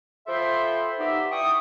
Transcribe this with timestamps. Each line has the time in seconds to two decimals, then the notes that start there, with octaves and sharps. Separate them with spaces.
0.27 F3 A4 E5 G5 B5 C6
0.99 B3 D#4 G4 D5 E5
1.31 E4 G5 C#6 D#6